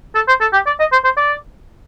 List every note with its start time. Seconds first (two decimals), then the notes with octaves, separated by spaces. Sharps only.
0.15 A4
0.28 C5
0.41 A4
0.53 G4
0.67 D5
0.80 D#5
0.92 C5
1.04 C5
1.17 D5